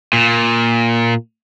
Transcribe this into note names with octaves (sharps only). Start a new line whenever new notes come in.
A#2